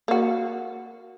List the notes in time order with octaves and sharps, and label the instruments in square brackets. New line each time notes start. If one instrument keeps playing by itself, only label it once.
[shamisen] A#3 F#4